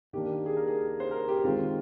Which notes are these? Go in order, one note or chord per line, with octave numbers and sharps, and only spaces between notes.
D#3 A#3 D4 G4
G#4
A#4
G#4
C5
A#4
G4
D#3 G#3 C4 F4